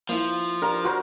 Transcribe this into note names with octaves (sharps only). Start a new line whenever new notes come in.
F3 A#3 E4
D4 F4 G4 A#4 D5
F#4 A#4 C5